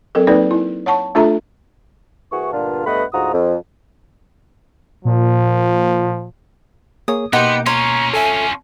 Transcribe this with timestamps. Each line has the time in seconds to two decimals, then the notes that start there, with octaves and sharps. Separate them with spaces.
0.15 F#3 C4 A4 A#4
0.27 F#3 A#3 C4 D#4 B4 D5
0.51 E4
0.86 C#5 F#5 A5 C#6
1.15 A3 D4 F4 A4 E5 A#5
2.32 C2 E3 F#4 G#4 C#6
2.52 G2 A#2 D3 B3 D4 F4
2.86 G2 A3 B3 D#5 F#5 B5
3.13 D2 G#2 F4 F#4 A#5 D#6
3.33 F2
5.05 A#2 F3
7.08 A#3 G#4 C#5 D#6
7.33 B2 A#3 B3 D#4 G4 F#5 C6
7.66 C#4 F4 C#5 A#5 C6
8.14 A4 E5 G#5